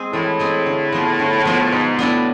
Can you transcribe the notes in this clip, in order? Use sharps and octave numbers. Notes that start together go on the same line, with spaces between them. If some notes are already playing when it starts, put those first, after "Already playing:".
Already playing: G#3 C4 G#4
A2 E3
G#3 C4 G#4
D3
F3 B3 F4
D3
F3 B3 F4
A2
G#2 B2
A2 B3 D4 A4